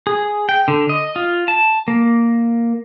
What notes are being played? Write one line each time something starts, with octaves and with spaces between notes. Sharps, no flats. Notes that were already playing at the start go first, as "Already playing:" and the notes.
G#4
G5
D3
D#5
F4
A5
A#3